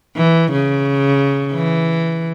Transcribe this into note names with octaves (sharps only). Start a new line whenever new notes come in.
E3
C#3
E3